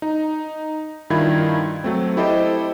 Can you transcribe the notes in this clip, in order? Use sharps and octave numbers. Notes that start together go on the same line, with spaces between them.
D#4
G2 D#3 E4 F4 G#6
F#3 A3 C4
E4 G4 A4 C5 D#5